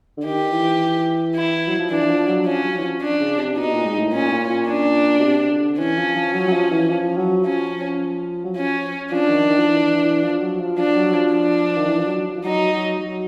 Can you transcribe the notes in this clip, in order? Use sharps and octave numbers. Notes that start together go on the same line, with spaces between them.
D3
D#3 G4
E3
E4
F#3
F3
E3 D4
E3
F3
F#3
F3 C#4
F#3
E3
F3
D4
C#3
C3
B2 D#4
A#2
G#2
A2
A#2 C#4
A#2
A#2
D4
B2
C3
D3
E3 C#4
F3
F3
F#3
F#3
F3
E3
F3
F#3
F3 C#4
F#3
F3 C#4
F3 D4
D#3
D#3
F3
E3
E3
F3
F#3
F3
F3 D4
F#3
F3
D4
D#3
E3
F3
F#3
F3
F#3 D#4
F#3
F#3